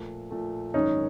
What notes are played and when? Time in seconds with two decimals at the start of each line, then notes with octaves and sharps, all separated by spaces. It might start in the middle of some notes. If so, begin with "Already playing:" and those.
Already playing: A#2 F3 A3
0.31 A#2 F3 A3
0.74 G#1 F#2 D#3 G#3 C#4 D#4